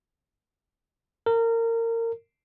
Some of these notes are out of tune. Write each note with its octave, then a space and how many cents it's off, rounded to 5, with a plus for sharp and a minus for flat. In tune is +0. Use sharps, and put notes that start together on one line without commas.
A#4 -25